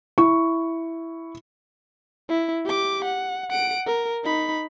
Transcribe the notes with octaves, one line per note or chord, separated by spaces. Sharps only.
E4 C#6
E4
G4 D6
F#5
F#5 D7
A#4
D#4 B5